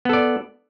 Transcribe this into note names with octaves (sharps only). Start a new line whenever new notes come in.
B3 A4 D5